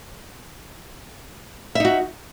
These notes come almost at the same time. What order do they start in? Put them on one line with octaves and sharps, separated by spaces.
E5 D#4 F#4